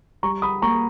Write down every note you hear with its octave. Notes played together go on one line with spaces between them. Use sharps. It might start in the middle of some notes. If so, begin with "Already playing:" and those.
G3 A#5 C#6
B5 D#6
A#3 A#5 C#6